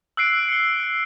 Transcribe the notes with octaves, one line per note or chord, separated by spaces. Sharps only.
E6 F#6 C7 D7
C#7 G7